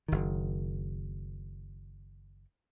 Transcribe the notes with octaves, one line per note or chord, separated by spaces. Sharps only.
F#1 D#3